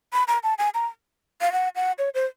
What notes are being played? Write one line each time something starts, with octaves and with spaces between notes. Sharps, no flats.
B5
A#5
A5
G#5
A#5
F5
F#5
F#5
C#5
C5